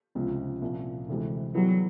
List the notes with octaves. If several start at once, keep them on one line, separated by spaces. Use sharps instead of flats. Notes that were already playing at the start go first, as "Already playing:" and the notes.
C#2 C3 F3 G#3
C2 A#2 F3
D2 C3 E3 G#3
E3 F#3 G3 B3 E4 G#4